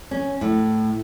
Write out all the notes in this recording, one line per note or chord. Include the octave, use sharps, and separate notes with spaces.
C#4
A2